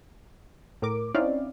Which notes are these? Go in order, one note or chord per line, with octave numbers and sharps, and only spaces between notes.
A2 A#4 D6
C4 C#4 D#4 E4 D5 F5